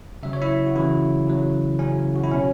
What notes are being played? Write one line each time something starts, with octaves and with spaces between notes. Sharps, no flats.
C#3 F#3 E5
C#5
E4 E5
F#4
C#3 E3 F#3 E4
C#3 F#3
C#3 F#3 C#4
F#4
E4
B2 F#3 C#4